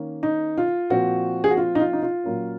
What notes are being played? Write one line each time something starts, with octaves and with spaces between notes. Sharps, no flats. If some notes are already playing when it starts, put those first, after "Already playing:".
Already playing: D#3 A#3 C#4
D#4
F4
A#2 F3 C4 F#4
G#4
F#4
F4
D#4
F4
D#4
F4
A#2 F#3 A#3 C#4